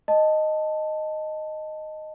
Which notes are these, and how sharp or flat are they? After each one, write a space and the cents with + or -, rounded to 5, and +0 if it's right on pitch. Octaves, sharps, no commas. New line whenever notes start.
D#5 -5 A5 +0